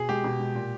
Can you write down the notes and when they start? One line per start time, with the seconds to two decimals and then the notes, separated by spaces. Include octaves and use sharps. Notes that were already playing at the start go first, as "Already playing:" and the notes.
Already playing: B2 G#4
0.09 G#3 G4
0.24 B2
0.39 G#3
0.55 A#2